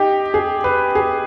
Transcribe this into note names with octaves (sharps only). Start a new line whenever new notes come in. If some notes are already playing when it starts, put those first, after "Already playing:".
Already playing: D#4 G4
G#4
B4
G#4